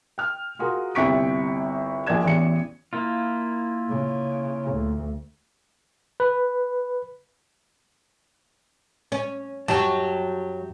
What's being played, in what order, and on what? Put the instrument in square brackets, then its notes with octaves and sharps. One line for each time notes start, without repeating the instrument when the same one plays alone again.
[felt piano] G5 F6
F4 F#4 G#4 A#4
G1 C2 G5 C#6 B6 D7
A#1 A#2 G#4 D5 G#6 E7
A1 E2 D5 C#7
[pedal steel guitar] A#3 E4 F4
[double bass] C#3
D2
[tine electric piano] B4
[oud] C#4
[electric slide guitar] F#2 G4 A5 [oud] F#3